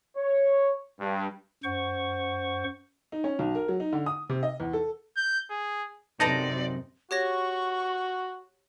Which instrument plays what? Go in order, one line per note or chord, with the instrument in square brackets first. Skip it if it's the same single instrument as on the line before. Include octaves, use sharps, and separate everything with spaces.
[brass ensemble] C#5
G2
[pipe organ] F#2 C5 F#5 C#6
[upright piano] D#4
C#4
B1
A#4
F#3
D#4
D3
D#6
C3
D#5
E2
A4
[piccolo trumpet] G6
G#4
[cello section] F#2 C3 [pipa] D4 A4 B4 [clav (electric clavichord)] D#4 A#5 [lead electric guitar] D5
[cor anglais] F#4 [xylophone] G4 C#5 A#6 [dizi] C#6